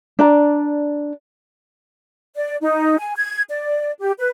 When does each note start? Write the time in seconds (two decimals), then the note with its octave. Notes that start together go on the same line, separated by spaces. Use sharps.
0.19 D4 D5 A#5
2.36 D5
2.61 D#4
2.98 G#5
3.16 G#6
3.49 D5
4.00 G4
4.19 B4